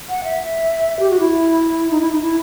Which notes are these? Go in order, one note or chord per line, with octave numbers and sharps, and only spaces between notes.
F#5
E5
G4
F#4
E4
D#4
E4
D#4
E4